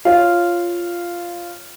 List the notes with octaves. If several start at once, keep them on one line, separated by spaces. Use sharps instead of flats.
F4 C#5 F5